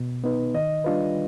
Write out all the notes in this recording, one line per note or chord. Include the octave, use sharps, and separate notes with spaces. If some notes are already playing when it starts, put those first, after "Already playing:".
Already playing: B2
B3 D#4 B4
D#3 D#5
G3 D4 F4 B4